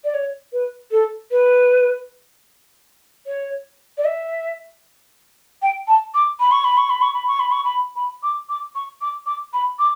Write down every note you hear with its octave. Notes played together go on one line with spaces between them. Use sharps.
D5
C#5
B4
A4
B4
C#5
D5
E5
G5
A5
D6
B5
C#6
B5
C#6
B5
C#6
B5
C#6
B5
C#6
B5
B5
D6
D6
C#6
D6
D6
B5
D6